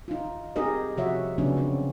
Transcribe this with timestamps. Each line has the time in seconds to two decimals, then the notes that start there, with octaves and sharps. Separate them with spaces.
0.08 D#4 F4
0.56 C4 D#4 G4 G#4 A#4 D#5
0.97 C3 F3 F#4 C#5 E5
1.38 C#3 F3 F#3 B3 C#4 D4
1.57 C4 D4